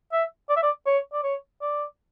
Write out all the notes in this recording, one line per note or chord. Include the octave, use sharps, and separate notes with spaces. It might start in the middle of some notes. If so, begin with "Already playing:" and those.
E5
D5
E5
D5
C#5
D5
C#5
D5